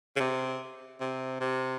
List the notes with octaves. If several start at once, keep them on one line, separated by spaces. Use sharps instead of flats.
C#3
C3
C3
C3